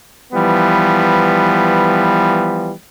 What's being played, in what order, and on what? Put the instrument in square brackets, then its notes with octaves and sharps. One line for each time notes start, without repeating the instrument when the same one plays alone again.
[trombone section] E3 F3 G3 B3